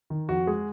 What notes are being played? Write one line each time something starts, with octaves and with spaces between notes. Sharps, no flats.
D#3
F2 F#4
G#3 G#4